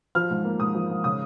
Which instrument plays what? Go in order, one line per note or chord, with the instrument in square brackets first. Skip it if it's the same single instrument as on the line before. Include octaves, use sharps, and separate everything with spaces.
[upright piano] F3 F6
G#2
A#3
G#2 D#6
F3
G#2
C#3 D#6